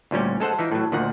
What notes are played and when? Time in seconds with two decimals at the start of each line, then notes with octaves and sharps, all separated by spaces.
0.11 D2 A#2 G3 C#4
0.40 G#3 A4 C5 F#5
0.59 E3 F3 D#4
0.72 A2 F#3
0.92 D2 A#2 D#3 F3 F#5